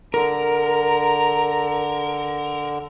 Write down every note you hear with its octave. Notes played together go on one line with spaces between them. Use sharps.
D3 A#4 A#5